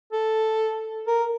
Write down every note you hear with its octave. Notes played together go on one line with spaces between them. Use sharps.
A4
A#4